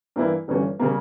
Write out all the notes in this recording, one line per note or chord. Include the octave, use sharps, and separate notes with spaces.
G2 E3 A#3 E4
G1 G2 E3 G3 C#4
C#3 G3 A#3